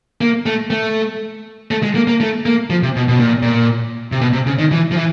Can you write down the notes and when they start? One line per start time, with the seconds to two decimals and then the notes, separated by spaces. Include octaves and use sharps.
0.21 A#3
0.46 A3
0.70 A3
1.71 A3
1.83 G#3
1.95 A#3
2.08 A#3
2.21 A3
2.46 A#3
2.70 F3
2.83 C3
2.96 B2
3.08 B2
3.19 A#2
3.42 A#2
4.12 C3
4.21 B2
4.33 C3
4.46 C#3
4.59 D#3
4.71 E3
4.91 F3
4.97 E3